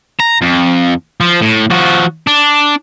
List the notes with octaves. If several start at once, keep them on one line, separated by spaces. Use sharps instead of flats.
A#5
F2
F3
A2
F3 F#4
D4